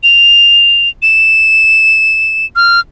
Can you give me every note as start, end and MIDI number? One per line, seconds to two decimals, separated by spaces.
0.03 0.89 101
1.02 2.46 100
2.56 2.80 89